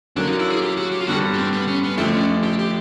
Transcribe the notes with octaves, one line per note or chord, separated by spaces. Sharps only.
D3 F#3 A#3 C#4 D4
D#4
E4
G#4
G4
F#4
G4
F4
G2 D3 G3 F#4
B3
C4
B3
C#4
B3
F2 D3 F3 A3 C4
C#4
G4
G4